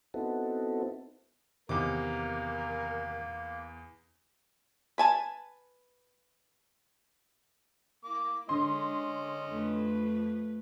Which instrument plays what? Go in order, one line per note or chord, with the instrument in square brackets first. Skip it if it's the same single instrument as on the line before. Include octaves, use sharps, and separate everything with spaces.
[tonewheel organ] B3 C4 D#4 E4 F#4 A4
[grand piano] E2 D6 [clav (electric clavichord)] C3 D#3 [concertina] A#3 [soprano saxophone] A#4
[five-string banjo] B4 G#5 A5
[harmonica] A#3 D6 [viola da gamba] E4
[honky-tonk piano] D3 C6 [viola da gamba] G#3 [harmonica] C#4 D#5
[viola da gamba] F2 A3 B4